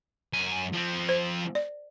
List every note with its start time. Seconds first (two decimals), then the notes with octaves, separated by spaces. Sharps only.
0.33 F#2 G#5
0.73 F3 C4
1.09 C5
1.55 D5